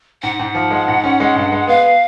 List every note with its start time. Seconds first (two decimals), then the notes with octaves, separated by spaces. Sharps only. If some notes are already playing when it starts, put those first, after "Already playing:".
0.23 G#2 F#5
0.39 G#2
0.55 F3
0.71 G#3
0.88 G#2
1.04 C#4
1.20 G#3
1.36 G2
1.52 G#3
1.67 B3 F5